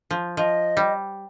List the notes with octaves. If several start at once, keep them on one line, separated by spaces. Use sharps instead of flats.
F3
F3 D#5
G3